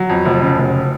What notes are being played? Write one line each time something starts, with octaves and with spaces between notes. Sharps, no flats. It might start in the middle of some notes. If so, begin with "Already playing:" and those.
Already playing: F#3
F2
F1
C#3
F1